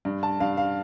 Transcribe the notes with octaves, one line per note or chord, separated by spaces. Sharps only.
G2
A5
G2 F5
F5